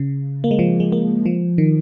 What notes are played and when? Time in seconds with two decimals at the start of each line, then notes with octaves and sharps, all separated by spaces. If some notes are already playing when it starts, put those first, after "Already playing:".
Already playing: C#3
0.44 A#3
0.51 G#3
0.59 F3
0.80 G#3
0.92 A#3
1.26 F3
1.58 D#3